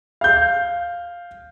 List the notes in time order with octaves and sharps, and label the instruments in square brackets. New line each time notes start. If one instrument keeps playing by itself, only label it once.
[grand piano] F5 G6